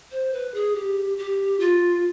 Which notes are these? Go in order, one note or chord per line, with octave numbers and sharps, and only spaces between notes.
C5
B4
G#4
G4
G4
F4